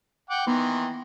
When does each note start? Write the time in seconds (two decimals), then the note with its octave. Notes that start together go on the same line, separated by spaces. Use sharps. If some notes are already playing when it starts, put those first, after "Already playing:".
0.30 F#5 G5 D6
0.47 D#3 E3 B3 D#4 C6